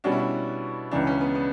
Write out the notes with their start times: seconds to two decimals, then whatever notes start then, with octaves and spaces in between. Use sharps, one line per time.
0.04 B2 G3 C#4 D4 F#4
0.12 E4
0.20 D4
0.91 C#2 C#3 E3 D4
1.07 C#4
1.21 B3
1.35 B3